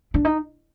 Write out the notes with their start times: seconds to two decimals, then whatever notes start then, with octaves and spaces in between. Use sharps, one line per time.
0.14 D4
0.25 D#4